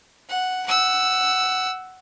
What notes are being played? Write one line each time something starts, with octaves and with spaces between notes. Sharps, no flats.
F#5
F#5 E6